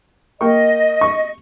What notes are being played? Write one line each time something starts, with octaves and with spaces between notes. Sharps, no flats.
A#3 D#5 G5 C#6
C#6